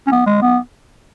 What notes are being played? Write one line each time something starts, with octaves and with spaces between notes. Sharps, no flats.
C#4
B3
G#3
B3